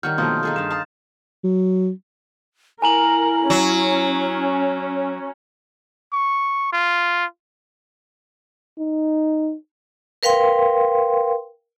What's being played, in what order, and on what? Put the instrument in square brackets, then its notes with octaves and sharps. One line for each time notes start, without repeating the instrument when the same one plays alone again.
[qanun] D#3 G3 C#5 [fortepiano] F#5 [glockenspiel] F6 G6
[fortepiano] B2 F3 A3 [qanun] A#3 [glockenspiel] C6 D#6 G6
[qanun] D#4 G#4 A4
[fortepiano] G2 [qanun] D#4 F5 [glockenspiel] E7
[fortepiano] F5 A#5 D#6 [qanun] A5
[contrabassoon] F#3
[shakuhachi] E4 [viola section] A#4 [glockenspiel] G#5 A#5 F#7
[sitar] F#3 [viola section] C#4
[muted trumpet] C#6
F4
[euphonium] D#4
[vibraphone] A#4 B4 F5 G5 C6